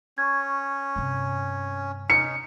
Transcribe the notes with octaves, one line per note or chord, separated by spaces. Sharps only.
C#4 C#6 G#6
G2 C3
C3 C#4 D#4 C#7